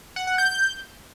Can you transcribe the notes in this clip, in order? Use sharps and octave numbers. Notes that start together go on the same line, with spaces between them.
F#5
F#5
G6